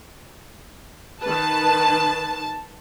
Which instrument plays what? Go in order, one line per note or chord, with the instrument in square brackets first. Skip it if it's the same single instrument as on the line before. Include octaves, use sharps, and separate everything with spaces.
[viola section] D#3 B4 [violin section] A5